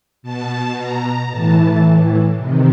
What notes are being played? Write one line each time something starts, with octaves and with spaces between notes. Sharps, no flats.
B2 A5
A#5
A2 E3 A5
C3 D#3